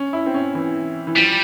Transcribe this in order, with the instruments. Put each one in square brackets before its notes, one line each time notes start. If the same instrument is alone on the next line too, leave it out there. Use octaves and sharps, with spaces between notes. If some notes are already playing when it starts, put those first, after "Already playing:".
Already playing: [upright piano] C#4
E4
C4
C#4
E3
E3
[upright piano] F3 [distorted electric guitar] G3